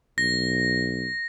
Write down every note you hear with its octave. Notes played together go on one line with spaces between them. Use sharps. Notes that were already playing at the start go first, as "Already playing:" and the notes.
B1 A#6